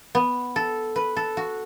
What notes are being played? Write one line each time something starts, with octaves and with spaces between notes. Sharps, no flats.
B3
A4
B4
A4
F#4